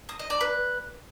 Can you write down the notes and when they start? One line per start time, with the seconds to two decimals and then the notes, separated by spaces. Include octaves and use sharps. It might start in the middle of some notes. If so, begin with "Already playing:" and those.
0.09 D#6
0.19 D#5
0.30 D5
0.41 B4